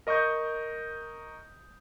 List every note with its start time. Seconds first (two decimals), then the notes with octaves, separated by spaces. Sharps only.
0.07 A#4 D#5 C#6 D#6 G6